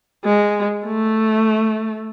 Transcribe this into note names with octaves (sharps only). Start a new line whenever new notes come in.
G#3
A3